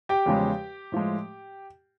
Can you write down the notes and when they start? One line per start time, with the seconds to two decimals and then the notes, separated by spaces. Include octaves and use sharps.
0.09 G4 G5
0.26 E2 C#3 F3 G#3
0.92 A2 F3 G#3